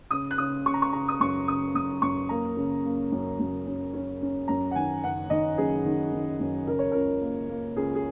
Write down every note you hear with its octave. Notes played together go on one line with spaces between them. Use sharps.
C#3 D#6
F#6
C#3 D#6
C#3 C#6
A#5
C#6
C#3 A#5
D#6
F#2 C#6
C#3 D#6
F#2 D#6
F#2 C#6
A#3 A#5
C#3
A#3
F#2
F#2
C#4
C#4
C#4
F#2 A#5
F#5
D#3 G#5
F#1 F#5
D#3 D#5
F#1 G#4
D#3
D#3
F#2
C#3 A#4
C#5
C#2 A#4
A#3
A#3
C#2 G#4
G#4